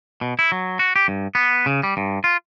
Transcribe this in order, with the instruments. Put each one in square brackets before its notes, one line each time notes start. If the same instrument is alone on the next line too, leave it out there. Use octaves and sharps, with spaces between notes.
[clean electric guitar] B2
E4
F#3
F#4
G4
G2
B3
C#3
G3
G2
F4